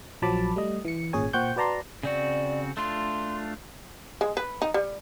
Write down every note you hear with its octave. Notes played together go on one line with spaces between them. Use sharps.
A#1 F3 F#3 A5 B5 D6
G3 A3 D#5
E3 C#7
G#1 A#2 C#4 G#4 C#5 G#5
A#2 C5 F#5 G5 C#6 G6
F#4 B4 D5 A5 A#5 C6
C#3 C4 F#4 D5
A3 D4 F4 C6
G#3
B4
D#4
G3